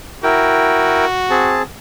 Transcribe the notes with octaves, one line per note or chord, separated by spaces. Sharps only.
E4 F#4 A#4 G5
C4 G#4 A5